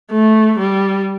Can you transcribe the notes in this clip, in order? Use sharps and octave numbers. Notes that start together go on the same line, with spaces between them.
A3
G3